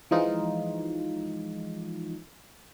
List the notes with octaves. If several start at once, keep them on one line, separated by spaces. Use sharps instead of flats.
E3 F3 G#3 D#4 F4